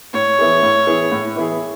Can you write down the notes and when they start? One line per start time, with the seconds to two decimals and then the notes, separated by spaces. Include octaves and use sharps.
0.14 A2 C#5
0.39 E3 B3 E4 G#4
0.63 A2
0.87 E3 B3 E4 G#4
1.12 A2
1.36 E3 B3 E4 G#4